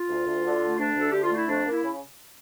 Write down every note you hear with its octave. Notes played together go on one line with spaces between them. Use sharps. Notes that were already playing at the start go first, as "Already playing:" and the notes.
Already playing: F4
D2
D2
D3
A3
D2 D4
D2 A4
D3 G4
F4
A3 E4
F2 D4
A#3 E4
C#3